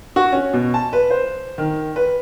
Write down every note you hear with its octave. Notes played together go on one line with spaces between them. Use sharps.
F#4
C#4
B2
A5
B4
C5
D#3
B4